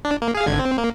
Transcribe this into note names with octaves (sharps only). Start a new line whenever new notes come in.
D4
A#3
G#4 F5
G#1 D3 G#6
C4
A#3